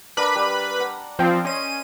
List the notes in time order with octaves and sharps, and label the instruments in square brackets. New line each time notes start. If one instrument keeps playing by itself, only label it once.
[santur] D4 A#4 F#5 [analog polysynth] B4 B5
[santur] G3
F#5
[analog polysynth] F3 C4 [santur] G5
[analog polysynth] C#4 D#7 [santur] D#5 C6